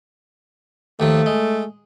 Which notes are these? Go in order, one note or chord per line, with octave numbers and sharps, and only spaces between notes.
D#2 D#3 F3 A3
G#3